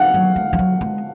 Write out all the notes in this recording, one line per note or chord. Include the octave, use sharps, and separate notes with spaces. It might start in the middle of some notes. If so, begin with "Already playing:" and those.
Already playing: F5 F#5
F#3
G#3
F3
F#3
G#3